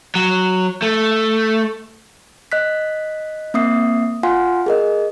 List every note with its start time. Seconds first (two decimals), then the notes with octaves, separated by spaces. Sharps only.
0.15 F#3
0.82 A3
2.52 D#5 F#6 B6
3.54 A#3 C4 E5 D#6 C7
4.23 F4 F5 F#5 G#5 C6
4.66 G#4 A#4 D#5